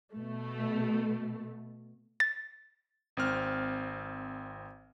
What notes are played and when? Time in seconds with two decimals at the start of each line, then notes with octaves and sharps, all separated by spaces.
0.12 B2 A3
2.20 A6
3.17 G#1 C4 F6